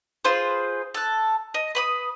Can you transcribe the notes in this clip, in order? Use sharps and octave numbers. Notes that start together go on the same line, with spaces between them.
F4 G#4 B4 C5
A4 F#6
D#5
B4 B5 D#6